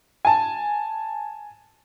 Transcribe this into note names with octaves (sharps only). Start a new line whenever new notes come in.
G#5 A5